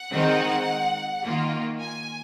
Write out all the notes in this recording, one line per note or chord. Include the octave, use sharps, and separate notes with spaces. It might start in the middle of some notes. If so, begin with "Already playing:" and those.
Already playing: F#5
D#3 G#3 C4 D#4
D#3 A#3 F4
G#5